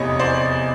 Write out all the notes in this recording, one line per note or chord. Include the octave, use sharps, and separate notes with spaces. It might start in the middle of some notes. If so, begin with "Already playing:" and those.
Already playing: F1 E2 C3 C#5 D#5
C5 D5